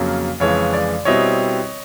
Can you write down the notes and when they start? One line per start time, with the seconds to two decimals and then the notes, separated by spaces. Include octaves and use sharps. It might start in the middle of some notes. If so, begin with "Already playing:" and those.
Already playing: F2 C#3 F#3 A#3 C#4
0.40 F2 C#3 E3 G#3 C#5
0.73 D5
1.05 B2 G3 C4 E4 C#5 D#5